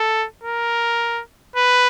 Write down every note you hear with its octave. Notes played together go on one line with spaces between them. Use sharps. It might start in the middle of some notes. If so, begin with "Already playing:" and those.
Already playing: A4
A#4
B4